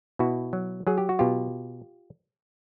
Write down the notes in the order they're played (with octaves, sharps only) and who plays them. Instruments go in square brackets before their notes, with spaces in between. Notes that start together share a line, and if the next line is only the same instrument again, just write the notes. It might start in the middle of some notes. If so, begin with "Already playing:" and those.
[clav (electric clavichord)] B2 E4 F#4
F#3
F#3 G#4
G4
F#4
B2 F4 G4